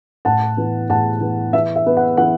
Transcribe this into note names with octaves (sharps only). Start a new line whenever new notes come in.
A2 F#5 A5
E3 B3
A2 F#5 A5
E3 B3
E3 E5
E5
B3
F#5
E3 F#5